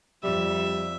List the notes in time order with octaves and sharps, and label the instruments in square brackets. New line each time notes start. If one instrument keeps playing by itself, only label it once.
[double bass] F2 [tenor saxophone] G3 [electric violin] E5